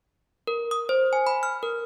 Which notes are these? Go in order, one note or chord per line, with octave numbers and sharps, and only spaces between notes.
A#4
D#6
C5
G#5
B5
F6
A#4